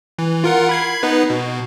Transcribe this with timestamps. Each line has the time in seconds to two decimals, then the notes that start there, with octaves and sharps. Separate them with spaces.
0.18 E3
0.44 F4 A#4 F#5
0.69 B5 G#6 C7
1.03 B3 D#4 B4
1.30 B2